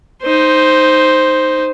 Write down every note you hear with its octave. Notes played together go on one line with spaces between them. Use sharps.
D#4 C5